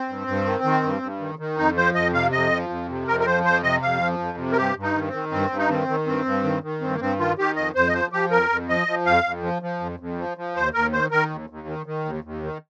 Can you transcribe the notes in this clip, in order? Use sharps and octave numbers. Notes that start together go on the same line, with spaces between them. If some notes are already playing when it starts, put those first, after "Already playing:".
Already playing: C4
G2
G2
D#3
D#3
G2
G2
D#3
D#3
F2 D#4
F3 C5
F2 D#5
C3 F5
F2 D#5
F3
F2
C3
F2 A#4
A#4
F3 C5
F2 C5
C3 D#5
F2 F5
F3
F2
C3
A#4
G2 G4
G2
D#4
D#3
C4
D#3
G2 C4
G2
D#4
D#3 C4
D#3
G2 C4
G2
D#3
D#3
G2 C4
A#3
G2 C4
D#3 F4
D#3 G4
F2 D#5
F2 C5
D#5
F3 C5
F3 G4
F2 A#4
F2
F3 D#5
F3
F2 F5
F2
F3
F3
F2
F2
F3
F3
D#2 C5
D#2 A#4
D#3 C5
D#3 A#4
D#2
D#2
D#3
D#3
D#2
D#2
D#3